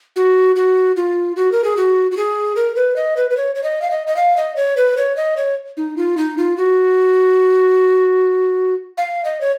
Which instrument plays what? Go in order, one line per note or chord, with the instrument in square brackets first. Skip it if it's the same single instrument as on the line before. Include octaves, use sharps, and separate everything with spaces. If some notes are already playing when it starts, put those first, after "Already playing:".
[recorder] F#4
F#4
F4
F#4
A#4
G#4
F#4
F#4
G#4
A#4
B4
D#5
B4
B4
C#5
C#5
D#5
F5
D#5
D#5
F5
D#5
C#5
B4
C#5
D#5
C#5
D#4
F4
D#4
F4
F#4
F5
D#5
C#5